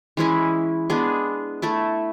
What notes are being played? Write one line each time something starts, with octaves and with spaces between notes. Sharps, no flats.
E3 G#3 C#4 E4
G#3 B3 D4 G#4
A3 E4 A4